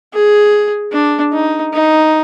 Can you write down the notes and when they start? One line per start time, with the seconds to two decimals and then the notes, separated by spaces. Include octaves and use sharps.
0.13 G#4
0.92 D4
1.33 D#4
1.74 D#4